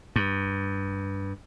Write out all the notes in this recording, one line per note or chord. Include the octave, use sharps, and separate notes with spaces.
G2